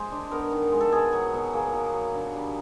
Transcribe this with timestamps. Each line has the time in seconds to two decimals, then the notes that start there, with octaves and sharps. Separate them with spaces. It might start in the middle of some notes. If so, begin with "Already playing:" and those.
Already playing: G#3 C5
0.12 D4
0.31 B3 A#4
0.52 D#3
0.72 G#3
0.81 A4
0.92 B2 G#4
1.13 F#3
1.33 B2
1.53 A#3 G#4
1.73 B2
1.94 F#3
2.14 D3
2.34 G3